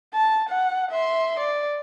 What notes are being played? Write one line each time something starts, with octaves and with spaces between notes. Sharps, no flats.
A5
F#5
E5 C6
D5